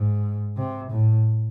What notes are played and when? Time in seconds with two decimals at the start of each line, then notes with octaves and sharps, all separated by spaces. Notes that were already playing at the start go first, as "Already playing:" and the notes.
Already playing: G#2
0.57 C3
0.91 A2